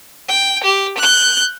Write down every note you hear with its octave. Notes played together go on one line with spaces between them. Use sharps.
G5
G4
F#6 G6